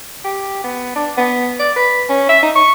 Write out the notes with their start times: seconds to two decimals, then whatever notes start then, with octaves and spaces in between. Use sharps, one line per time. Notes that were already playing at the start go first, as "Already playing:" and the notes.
0.25 G4
0.64 B3
0.96 D4
1.18 B3
1.60 D5
1.76 B4
2.09 C#4
2.29 E5
2.43 D#4
2.56 C#6